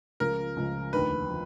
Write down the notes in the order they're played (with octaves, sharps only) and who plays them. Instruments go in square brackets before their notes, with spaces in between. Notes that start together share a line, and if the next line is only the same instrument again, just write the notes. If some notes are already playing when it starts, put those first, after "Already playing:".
[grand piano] C#2 C#3 F3 [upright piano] A#4
[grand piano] C#2 C#3 F3
[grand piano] F1 D#2 D3 F3 [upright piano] B4
[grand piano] F3